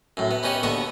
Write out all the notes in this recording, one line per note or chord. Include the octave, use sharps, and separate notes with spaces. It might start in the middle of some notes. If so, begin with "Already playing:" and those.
F#2 A2
B3
B3 C#4 D#4 G4 C#5
D#2 D3 B3 C#6 D#6